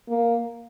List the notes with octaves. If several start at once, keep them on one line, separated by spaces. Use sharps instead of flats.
A#3